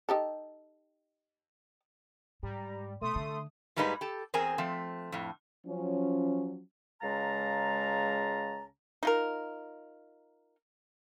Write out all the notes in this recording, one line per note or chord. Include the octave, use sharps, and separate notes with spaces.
D#4 G4 A4
G#2 G3 A#5
B2 A3 C6 D#6
D3
G#2 G3 G#3 A#3 D#4 B4
G4 A4
E2 C4 G#4 A#4 G#5
F3 A3 C4
F2 A2
F3 F#3 C#4
C#2 C#3 G#3 F5 A5 A#5
D#4 F4 A#4